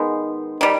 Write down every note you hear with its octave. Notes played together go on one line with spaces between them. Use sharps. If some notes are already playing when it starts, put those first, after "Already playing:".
Already playing: D#3 G#3 B3
D#3 G3